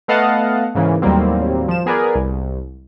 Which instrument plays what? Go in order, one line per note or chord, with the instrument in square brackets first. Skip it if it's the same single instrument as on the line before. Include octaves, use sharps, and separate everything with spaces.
[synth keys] A3 B3 D#5 F5 F#5 A5
G#2 C#3 E3 A#3
D#2 A2 F#3 G3 A#3 C4
F3 E7
B3 G#4 A#4 B4 D5 G#5
C2